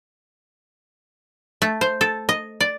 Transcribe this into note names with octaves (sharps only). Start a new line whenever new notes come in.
A3
C5
A4
D#5
D5